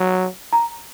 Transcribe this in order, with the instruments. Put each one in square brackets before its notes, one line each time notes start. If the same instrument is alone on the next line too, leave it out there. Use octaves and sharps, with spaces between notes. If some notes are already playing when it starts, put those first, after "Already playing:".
Already playing: [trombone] F#3
[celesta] A#5